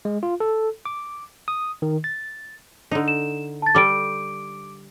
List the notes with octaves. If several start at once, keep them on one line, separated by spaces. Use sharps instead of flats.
G#3
F4
A4
D6
D#6
D#3
A6
D3 D#4
E7
A5 A6
G3 A4 D6 D7